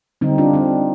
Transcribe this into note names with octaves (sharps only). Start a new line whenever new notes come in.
D3 G3 C4 D#4
D4 F4
C4 D#4